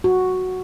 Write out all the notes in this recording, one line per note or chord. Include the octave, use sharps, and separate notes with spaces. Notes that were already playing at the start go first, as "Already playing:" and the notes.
F#4